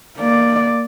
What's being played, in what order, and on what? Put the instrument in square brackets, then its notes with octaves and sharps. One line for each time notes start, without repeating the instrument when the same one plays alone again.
[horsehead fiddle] A#3 D5